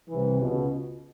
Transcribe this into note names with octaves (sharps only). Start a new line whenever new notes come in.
C2 C3 E3
C#2 B2